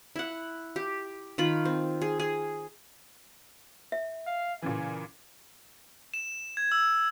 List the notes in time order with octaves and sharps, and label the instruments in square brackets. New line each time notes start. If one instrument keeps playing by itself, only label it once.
[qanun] E4 F#5
G4
D#3 F4 B5
C4
G#4
G#4
[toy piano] E5
[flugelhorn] F5
[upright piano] A#2 C#3 E3 [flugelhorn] G#5
[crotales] E7
G#6
E6